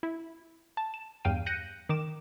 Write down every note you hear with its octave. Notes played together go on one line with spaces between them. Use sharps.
E4
A5
E7
E2 G2 F5 G5 D#7
F#6 G6 A#6 C#7 D#7
D#3 D6 E7